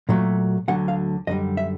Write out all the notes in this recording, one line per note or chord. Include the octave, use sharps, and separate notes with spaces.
A#2 F#3 A3
D2 D3 F#3 F#5
F5
F#2 D3 G3 D#5
E5